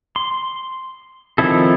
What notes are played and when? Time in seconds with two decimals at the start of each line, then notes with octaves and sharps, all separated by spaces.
0.16 C6
1.38 D#3 F3 C4 E4 A4